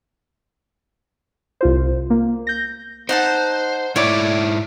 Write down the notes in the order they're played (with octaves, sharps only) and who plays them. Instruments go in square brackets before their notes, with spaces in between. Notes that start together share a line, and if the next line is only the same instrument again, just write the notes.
[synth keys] C2 F4 C5
A#3
G6 A#6
[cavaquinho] D#4 F#5 A5 [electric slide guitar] C5
[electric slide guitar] G#2 E4 E5 [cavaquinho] C#5 D5 D6